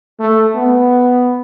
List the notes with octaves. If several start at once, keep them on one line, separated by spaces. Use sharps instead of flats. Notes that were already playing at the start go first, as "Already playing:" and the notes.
A3
B3